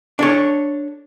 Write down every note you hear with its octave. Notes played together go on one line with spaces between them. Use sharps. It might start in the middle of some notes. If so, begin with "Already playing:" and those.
D4 A4 C#5